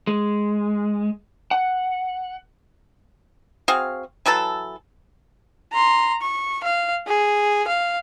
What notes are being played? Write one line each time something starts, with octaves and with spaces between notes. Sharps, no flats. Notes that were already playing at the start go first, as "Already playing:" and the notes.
G#3
F#5
C4 F#4 G#4 F5
E3 F#3 A4 A5
A#5 C6
C#6
F5
G#4
F5